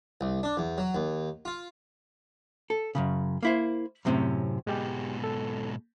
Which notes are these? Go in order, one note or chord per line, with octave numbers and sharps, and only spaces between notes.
C2
D4
E2
F#3
D#2
F4
A4
F#2 A#2 C#3
A#3 E4 C5
F#2 A2 C3 C4 C#4
G#2 B2 G#3 G4
A4